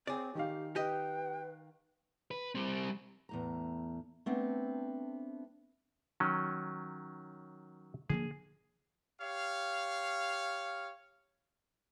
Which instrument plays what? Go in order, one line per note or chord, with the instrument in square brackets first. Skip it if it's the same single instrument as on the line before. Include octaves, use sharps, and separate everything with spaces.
[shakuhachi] C4 [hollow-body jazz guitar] G#4 D5 [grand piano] C#5
[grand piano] D#3 F5 [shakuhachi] G4
[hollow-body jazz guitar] G4 D#5 [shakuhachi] B4 [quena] G5
[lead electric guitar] B4
G3 C4
[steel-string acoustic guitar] E2 A2 A#5
A3 B3 C4 D4
[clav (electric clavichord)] D#3 F#3 C#4
[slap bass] D3 F3 A#3 [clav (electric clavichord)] G#4
[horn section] G4 C#5 F5